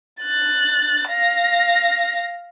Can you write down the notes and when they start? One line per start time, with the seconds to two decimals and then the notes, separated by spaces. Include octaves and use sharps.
0.21 F#6 A6
1.09 F5 A#6